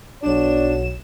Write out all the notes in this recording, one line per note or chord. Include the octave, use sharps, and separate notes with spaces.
B1 D4 F#4 C#5 E7